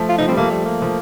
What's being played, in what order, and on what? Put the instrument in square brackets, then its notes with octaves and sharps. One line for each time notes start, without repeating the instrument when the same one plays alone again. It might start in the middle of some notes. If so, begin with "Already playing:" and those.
Already playing: [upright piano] F3 A3
[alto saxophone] F4
[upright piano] F3 [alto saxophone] D#4
[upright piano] G3 [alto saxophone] C4
[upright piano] F3 A3 [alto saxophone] A#3
[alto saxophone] G3
A#3
[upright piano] F3